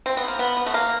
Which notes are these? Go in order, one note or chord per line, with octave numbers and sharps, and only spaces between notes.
C4
B3
A#3
B3
B3
A3
A#3